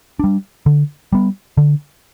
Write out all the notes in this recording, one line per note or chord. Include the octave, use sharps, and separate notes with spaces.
G3 D4
D3
G3 B3
D3